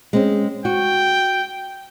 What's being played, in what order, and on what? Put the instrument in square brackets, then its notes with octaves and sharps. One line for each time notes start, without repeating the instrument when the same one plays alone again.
[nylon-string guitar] G#3 C4 C#4
[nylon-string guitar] F#4 [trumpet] G5